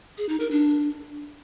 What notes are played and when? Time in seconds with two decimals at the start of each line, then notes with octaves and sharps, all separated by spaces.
0.18 G#4
0.29 D#4
0.40 A#4
0.51 D4